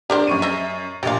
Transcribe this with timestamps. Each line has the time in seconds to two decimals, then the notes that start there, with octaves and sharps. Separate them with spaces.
0.10 D4 G4 A#4 C5
0.28 F#2 C#6 D#7
0.42 D#5 E5
1.03 A#1 A#2 G4 F5